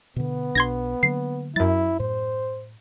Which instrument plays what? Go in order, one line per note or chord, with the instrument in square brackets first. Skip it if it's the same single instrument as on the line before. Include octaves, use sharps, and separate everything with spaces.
[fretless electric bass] B2 D3 [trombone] B3
[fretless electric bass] B1 B2 D4 [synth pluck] C6 G#6 A#6
[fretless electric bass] D3 F#3 A#3 [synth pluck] C7
[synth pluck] F#2 A6 [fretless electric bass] F#3 [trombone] E4
[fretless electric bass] A2 [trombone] C5